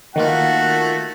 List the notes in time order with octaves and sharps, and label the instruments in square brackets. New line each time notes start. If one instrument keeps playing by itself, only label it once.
[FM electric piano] D#3 A#3 F4 [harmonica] A3 F#4 [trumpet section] F#5